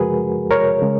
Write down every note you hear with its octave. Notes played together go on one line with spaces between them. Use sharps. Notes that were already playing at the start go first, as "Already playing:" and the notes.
Already playing: F#2 C#3 F3 G#3 F#4 G#4 A#4 B4
A#4 C#5
C#3 G#3